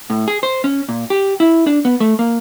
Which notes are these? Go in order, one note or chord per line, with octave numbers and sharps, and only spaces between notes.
A2
G#4
C5
C#4
A#2
G4
E4
D4
B3
A3
A#3